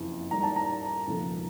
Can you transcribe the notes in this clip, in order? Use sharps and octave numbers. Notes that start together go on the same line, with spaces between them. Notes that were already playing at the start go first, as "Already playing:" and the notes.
Already playing: F#1 F2 C#3 E3
D#2 D#3 G3 A#5
A5
A#5
E1 D#2 C#3 F3 A3